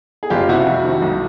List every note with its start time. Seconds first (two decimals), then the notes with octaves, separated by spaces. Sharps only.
0.23 G#4
0.30 F#1 F4 G4
0.48 C3 E4 F#4
0.67 F2
0.84 D#3
1.02 B1